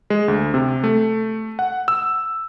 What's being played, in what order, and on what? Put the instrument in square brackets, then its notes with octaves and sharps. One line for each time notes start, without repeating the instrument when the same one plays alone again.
[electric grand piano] G#3
D2
C3
A3
F#5
E6